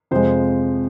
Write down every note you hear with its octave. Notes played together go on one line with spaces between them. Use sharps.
F2 C3 F3 G#3 C5